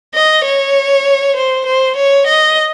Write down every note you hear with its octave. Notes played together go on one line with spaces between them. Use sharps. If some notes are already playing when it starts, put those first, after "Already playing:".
D#5
C#5
C5
C5
C#5
D#5